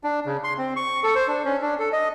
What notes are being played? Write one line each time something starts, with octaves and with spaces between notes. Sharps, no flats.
D4
C#3
C6
C4
C#6
A4
C5
D4
C#4
D4
A4
D#5